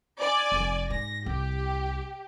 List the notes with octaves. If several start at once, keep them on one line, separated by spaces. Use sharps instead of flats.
D5 G#5
F1 F2
G#2 A#6
C2 G4